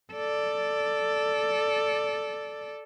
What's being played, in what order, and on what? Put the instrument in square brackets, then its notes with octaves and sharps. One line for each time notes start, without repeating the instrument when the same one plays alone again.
[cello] A4 D5